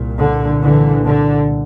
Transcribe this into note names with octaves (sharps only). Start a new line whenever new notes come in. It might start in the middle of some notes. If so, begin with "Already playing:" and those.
Already playing: C2 A#2
D3
D3 E3
D3